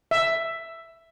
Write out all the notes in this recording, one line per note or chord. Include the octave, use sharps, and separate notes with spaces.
E5